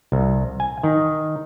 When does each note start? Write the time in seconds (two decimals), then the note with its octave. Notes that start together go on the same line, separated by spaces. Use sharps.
0.12 C2
0.60 G#5
0.84 D#3